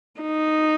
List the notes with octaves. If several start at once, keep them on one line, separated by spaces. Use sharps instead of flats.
D#4